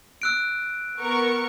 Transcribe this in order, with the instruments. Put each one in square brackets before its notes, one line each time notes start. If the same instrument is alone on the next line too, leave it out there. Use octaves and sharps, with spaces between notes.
[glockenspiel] E6 F#6 D7
[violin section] B3 A#4 C#6